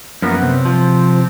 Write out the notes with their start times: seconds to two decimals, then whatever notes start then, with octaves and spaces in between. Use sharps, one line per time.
0.22 F#2 F3 A#3 B3
0.41 C3
0.65 F3